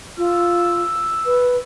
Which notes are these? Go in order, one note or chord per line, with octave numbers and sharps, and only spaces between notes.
F4 E6
B4